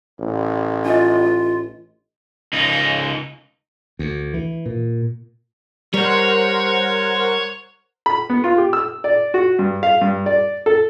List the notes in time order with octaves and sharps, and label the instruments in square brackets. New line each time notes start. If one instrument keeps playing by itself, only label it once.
[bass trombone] A1
[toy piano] D4 D#5 [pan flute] F4
[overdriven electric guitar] C#2 D#4
[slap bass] D2
E3
A#2
[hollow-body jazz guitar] G3 [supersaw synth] A#4 C5 F#5 [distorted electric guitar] C#5
[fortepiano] B5
B3
F4
G4
E6
D5
F#4
G2
F5
G2
D5
A4